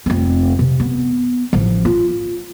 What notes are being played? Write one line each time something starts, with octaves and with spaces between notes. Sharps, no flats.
F1 C4
C3
B3
A1 F3
F4